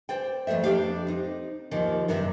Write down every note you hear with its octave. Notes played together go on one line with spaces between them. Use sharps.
C5 D5 G5
F2 A3 A4 C5 E5
F2 D4 G4 F5
C4 D#4
D#2 D#3 F3
F#2 C3 D4 A#4 B4 E5